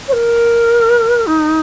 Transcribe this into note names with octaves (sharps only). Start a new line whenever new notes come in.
C#5
A#4
D#4